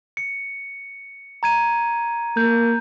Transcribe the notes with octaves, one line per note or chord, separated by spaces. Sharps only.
C#7
A#5 G#6 D#7
A#3 G6